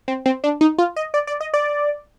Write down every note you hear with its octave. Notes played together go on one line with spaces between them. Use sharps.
C4
C4
D4
D#4
F4
D#5
D5
D5
D#5
D5